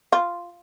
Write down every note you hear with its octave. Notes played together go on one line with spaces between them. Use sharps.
F4